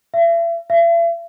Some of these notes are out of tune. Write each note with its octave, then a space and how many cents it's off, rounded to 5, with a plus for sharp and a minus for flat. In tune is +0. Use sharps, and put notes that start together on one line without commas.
E5 +40
E5 +45